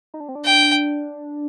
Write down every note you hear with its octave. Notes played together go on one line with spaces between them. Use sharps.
D#4
D4
C4
D4
G5